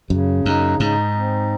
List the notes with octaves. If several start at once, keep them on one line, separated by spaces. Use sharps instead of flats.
F#2 C#3
F#2 D#4
G#2 D#4
C4